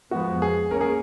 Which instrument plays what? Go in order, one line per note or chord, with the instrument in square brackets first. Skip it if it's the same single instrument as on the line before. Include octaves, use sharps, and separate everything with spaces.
[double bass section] F2 F3 G#3 B3 [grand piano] F#4
[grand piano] G#4
[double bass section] A#3 C#4 [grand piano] A#4
[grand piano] G#4